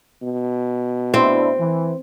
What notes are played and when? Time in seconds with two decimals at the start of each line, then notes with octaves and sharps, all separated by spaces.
0.22 B2
1.14 C4 D4 E4
1.59 E3